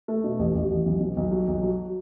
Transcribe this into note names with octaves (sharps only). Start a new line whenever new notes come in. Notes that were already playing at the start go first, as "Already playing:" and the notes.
A3
B2
A1
A1
A1
B1
B2
B1
F#3
B1
F#3